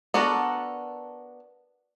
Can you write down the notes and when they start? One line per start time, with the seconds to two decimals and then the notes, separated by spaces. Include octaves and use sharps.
0.14 B3 D4 F#4 A4 A#4